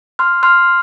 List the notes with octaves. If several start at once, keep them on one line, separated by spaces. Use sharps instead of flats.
C6 F6
C6 F6